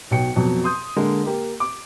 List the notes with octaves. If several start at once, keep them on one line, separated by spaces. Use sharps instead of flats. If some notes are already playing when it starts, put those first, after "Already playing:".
B1 B2 G5 C#7
F2 B2 F#3
C6 D#6 G6
D3 G#3 A#3
A#3 G4
D6